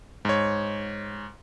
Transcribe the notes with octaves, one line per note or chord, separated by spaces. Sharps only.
G#2 C#5